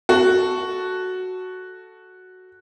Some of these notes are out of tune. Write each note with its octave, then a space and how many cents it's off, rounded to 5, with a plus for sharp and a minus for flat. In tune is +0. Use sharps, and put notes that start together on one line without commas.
F#4 +0 A4 +0